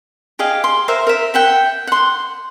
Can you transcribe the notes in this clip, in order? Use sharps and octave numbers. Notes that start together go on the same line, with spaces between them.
G4 G#4 D#5 F5
C6
A#4 C5 E5 F5
A#4 E5
E5 F#5 G5
F#5 C6